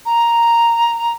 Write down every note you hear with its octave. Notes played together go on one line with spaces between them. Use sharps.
A#5